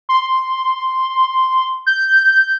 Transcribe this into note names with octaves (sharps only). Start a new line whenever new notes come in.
C6
G6